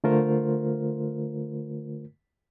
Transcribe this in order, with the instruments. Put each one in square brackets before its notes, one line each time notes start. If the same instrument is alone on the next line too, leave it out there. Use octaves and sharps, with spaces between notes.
[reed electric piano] D3 A3 F4 A#4 C5